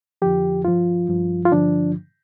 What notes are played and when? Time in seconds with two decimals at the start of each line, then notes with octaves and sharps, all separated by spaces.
0.22 F2 D3 F3 G4
0.65 G2 F3 F4
1.09 G2 F3
1.45 F4
1.52 G2 D3 F3 D4